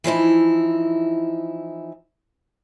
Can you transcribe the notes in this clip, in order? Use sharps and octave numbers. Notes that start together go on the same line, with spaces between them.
E3 F3 D#4 E4